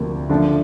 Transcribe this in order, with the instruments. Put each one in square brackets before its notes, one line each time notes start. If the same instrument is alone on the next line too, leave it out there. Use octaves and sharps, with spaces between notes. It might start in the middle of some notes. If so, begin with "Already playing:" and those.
Already playing: [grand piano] D2 C3 F3 A#3
D3 F3 A3 D4